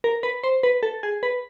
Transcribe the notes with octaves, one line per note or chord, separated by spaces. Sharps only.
A#4
B4
C5
B4
A4
G#4
B4